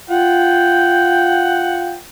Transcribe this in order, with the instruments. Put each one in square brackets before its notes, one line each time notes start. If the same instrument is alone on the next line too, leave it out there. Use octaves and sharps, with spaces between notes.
[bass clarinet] F4 [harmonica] F#5 G5